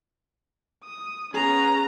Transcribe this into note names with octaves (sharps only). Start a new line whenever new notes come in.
D#6
B3 C#4 G#4 A#5